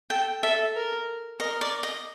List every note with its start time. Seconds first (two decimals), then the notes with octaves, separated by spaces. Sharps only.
0.10 A4 G5
0.42 A4 E5
0.75 A#4
1.39 A#4 D#5
1.61 D5
1.83 D#5